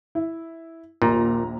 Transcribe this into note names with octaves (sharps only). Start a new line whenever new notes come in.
E4
A#1 D#2 A#2 A#5